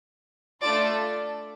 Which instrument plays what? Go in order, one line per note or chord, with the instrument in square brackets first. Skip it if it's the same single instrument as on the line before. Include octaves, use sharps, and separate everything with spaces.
[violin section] A3 D4 F4 A4 D5